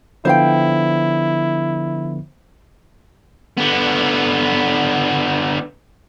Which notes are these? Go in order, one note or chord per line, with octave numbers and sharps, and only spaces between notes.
D3 F3 B3 E4 C5 F5 G5
D3 B3